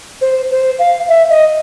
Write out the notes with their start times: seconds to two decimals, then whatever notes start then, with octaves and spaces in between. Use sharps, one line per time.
0.21 C5
0.51 C5
0.79 F5
1.08 E5
1.30 D#5